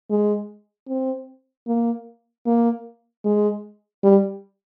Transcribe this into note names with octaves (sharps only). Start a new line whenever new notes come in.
G#3
C4
A#3
A#3
G#3
G3